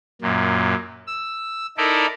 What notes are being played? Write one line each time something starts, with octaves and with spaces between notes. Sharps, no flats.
F#2 A#2
E6
D#4 E4 A4 A#4 D5